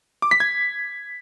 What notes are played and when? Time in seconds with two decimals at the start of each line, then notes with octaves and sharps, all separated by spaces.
0.22 D6
0.31 B6
0.40 G#6